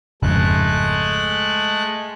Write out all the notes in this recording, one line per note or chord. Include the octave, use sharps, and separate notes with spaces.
G#1 F2 C#3 G#3 A3 F#6